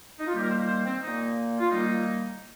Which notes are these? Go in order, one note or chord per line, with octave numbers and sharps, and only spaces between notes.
D#4
F4
D#3 G3 A#3 G4
A#4
C5
C5
C4
A#2 A#3 D#4
F4
D#3 G3 A#3 D#4